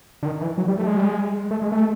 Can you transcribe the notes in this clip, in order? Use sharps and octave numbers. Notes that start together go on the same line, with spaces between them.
D3
D#3
E3
F#3
G3
A3
G#3
G3
G#3
A3
G#3
A3